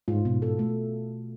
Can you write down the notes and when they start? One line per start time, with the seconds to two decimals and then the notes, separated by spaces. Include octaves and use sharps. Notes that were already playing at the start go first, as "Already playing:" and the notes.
0.08 G#2 F4
0.25 B2
0.42 A4
0.59 A3